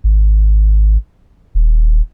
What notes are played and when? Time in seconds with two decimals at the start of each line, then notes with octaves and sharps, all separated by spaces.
0.04 G#1
1.55 D#1